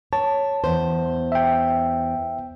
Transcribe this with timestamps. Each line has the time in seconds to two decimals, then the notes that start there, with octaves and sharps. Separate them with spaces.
0.13 C#5 A5
0.64 E2 C5
1.32 E5 G5